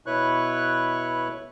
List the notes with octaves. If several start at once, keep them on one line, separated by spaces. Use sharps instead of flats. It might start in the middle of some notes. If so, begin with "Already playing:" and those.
B2 E4 B4 C#5 C#6 F#6